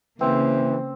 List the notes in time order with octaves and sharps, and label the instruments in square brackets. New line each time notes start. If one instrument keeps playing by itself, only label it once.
[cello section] C#3 A#3 [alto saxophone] E3 [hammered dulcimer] C4